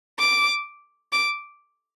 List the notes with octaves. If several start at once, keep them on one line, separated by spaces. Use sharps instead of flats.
D6
D6